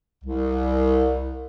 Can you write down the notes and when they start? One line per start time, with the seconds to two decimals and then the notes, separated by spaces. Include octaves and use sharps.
0.24 C2